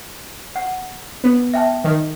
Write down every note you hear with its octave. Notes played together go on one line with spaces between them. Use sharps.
F#5
B3
E5 G5 A5
D#3